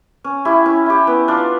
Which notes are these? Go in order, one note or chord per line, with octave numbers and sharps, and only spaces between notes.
C#4
E4 G4
C#4
E4 G4
B3
D4 F4